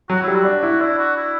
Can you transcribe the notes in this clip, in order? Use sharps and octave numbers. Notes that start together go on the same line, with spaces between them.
F#3 F#4
E4
G3
F#4
D4
E4
D4 E4
F#4
E4